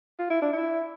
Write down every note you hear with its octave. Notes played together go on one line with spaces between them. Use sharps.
F4
E4
D4
E4